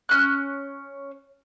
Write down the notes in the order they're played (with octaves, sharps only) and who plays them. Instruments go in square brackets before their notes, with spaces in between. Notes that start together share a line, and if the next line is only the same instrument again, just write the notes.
[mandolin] C#4 F#6